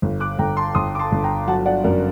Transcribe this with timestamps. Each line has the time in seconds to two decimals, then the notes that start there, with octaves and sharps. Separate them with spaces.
0.02 G1
0.20 D6 F#6
0.38 G1 G5 A#5
0.57 A5 C6
0.75 G1 C6 D#6
0.95 D6
0.99 A5 C6
1.12 G1
1.24 G5 A#5
1.47 F#3 F#5 A5
1.66 D5 F#5
1.84 F#2 A#4 D5